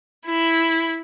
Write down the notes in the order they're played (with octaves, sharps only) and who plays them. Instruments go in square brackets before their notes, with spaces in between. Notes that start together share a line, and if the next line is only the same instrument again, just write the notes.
[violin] E4